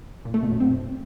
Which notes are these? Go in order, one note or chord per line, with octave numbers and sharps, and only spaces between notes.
A#2
A3
B2
F#2
C4